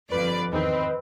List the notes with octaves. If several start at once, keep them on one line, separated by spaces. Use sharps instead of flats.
G1 F2 B4 D5
E2 G#2 D#3 C4 D#5